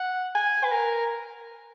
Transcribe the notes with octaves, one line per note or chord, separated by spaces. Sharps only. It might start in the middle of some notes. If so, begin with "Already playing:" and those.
Already playing: F#5
G#5
B4
A#4